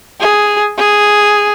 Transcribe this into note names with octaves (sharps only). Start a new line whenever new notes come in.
G#4
G#4